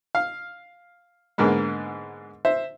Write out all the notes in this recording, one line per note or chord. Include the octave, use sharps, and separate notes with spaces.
F5
G#2 D3 G#3 A#3 B3
C5 E5